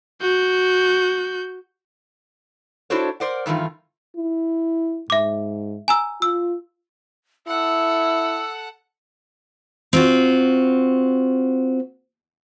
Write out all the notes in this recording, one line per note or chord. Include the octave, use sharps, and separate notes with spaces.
F#4 G6
D4 E4 F#4 A4 C5 C#5
A#4 C5 D5 F#5
G2 D#3 E3 A3 F4
E4
G#2 E5 D6
G#5 A#5 E6
F4 E6
E4 A4 F#5 E6
C4 F4 F#4